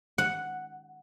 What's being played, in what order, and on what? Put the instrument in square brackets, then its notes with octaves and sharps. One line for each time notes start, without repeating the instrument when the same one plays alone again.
[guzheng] F#5